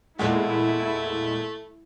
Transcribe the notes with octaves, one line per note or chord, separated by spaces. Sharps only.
E2 A#2 G#3 A3 E4 F#5